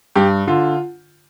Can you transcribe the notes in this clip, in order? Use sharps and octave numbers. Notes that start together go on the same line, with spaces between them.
G2 G4
D3 F4